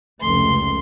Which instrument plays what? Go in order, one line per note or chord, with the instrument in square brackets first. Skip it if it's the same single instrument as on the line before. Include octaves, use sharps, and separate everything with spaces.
[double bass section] F1 C#2 A3 [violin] C6